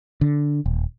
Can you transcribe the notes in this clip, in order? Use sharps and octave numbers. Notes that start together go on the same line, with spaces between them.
D3
D#1